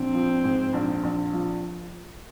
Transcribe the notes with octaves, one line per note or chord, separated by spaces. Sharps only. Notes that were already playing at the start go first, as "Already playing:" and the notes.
Already playing: A#1 C4
F3
G#2
A#1
A#1
F3